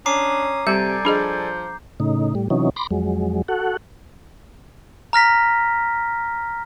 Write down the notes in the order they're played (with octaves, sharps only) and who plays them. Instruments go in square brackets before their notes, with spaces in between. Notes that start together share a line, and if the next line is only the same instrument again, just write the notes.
[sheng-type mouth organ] C#4 D#6 [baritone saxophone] D4 [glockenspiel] A#5 D6 C7
[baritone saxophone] C3 [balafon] G3 [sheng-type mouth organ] A4 D5 G#5 [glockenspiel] G6
[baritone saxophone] F3 [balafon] D4 G#4 D#5
[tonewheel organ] A2 C#3 D#4
A2 G3
C3 E3 F#3 C#4 D#4
B5 C6 D6 A#6
F2 F#3 G#3
F#4 A4 F#5
[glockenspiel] A#5 F6 A#6 B6